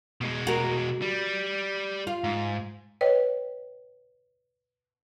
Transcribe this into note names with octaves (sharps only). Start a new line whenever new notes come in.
B2 G#3
F#4 A#4
G3
F4
G#2
B4 C#5 D#5 G5